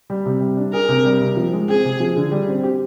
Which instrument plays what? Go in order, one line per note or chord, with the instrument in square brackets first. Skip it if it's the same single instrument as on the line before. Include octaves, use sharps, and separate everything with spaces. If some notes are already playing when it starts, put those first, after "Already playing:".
[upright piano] G3
C3
G3
D4
[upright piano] G#4 [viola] A#4
[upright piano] C3
G3
C3
F3
G#3
[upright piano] C4 [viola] G#4
[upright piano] C3
F3
D3
G3
C4
G4